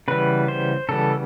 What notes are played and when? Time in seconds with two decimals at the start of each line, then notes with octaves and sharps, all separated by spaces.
0.08 C#3 E3 G3 B3 B4
0.48 C5
0.89 C#3 E3 G3 B3 A4